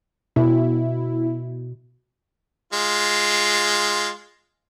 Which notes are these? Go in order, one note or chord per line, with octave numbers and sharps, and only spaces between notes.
B2 E4
G#3 F4